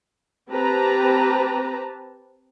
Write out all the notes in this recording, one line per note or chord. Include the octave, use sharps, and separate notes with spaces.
C4 G4 B4 A5 A#5